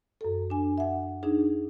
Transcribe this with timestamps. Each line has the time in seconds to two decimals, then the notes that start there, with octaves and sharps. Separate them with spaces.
0.21 F#2 A4
0.50 D4 G#5
0.78 E5 F#5
1.23 D4 D#4 G#4